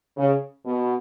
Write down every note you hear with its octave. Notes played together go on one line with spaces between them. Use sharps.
C#3
B2